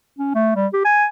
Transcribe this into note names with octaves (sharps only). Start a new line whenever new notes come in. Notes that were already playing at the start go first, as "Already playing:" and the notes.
C#4
A3
G3
G4
G#5